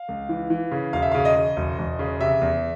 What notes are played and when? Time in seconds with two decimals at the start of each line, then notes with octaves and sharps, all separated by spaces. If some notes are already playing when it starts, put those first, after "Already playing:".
Already playing: F5
0.08 C#2
0.29 E3
0.50 E3
0.71 C#3
0.93 E1 F5
1.02 E5
1.11 C#3 F5
1.25 D#5
1.35 C#3
1.57 E1
1.78 E1
1.99 C#3
2.20 C3 E5
2.41 E2